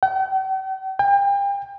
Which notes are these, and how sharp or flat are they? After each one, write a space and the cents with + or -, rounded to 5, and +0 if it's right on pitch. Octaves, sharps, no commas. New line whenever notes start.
G5 -45
G5 +35